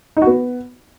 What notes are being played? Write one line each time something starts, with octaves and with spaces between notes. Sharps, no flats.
D#4
F#4
B3